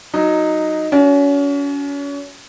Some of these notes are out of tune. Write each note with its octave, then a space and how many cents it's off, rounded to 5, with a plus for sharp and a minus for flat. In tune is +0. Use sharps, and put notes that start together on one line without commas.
F#3 +0 D#4 +0
C#4 +35 F#4 +0